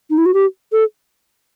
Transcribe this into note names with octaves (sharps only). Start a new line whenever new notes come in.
D#4
E4
F#4
G4
A4